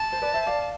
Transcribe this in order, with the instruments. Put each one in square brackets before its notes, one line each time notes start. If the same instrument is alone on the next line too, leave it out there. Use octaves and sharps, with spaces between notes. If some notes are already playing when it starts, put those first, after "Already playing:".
Already playing: [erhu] A5
[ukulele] C5
B4 D5
C5 E5
D5 F5